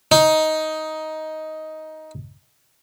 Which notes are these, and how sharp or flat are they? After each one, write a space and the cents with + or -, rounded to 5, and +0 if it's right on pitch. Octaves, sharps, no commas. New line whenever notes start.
D#4 +10